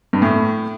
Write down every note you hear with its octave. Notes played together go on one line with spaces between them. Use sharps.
G2
A2